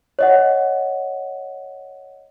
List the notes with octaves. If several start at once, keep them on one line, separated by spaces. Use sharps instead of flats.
C#5 D#5 F#5